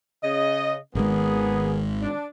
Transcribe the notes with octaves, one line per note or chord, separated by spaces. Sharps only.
C#3 D#5
G#1 D#3 G#3 A#3 B3 G#4
D4